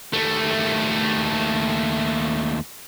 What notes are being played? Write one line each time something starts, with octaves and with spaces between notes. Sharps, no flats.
D#2 A3